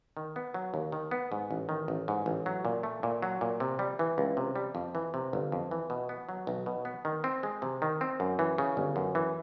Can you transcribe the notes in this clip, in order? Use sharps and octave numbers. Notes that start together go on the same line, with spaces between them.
D#3
B3
F#3
D#2
D#3
B3
G#2
A1
D#3
A1
G#2
A1
F#3
A#2
A3
A#2
F#3
A#2
C3
G3
E3
C#2
C3
G3
F2
E3
C3
G1
F2
E3
B2
B3
F#3
B1
B2
B3
D#3
C4
G#3
C3
D#3
C4
F#2
E3
C#3
G1
F#2
E3